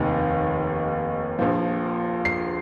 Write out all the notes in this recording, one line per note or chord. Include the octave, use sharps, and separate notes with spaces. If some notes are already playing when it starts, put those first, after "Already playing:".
Already playing: F1 D#2 D#3
A#1 A#2 F3
C7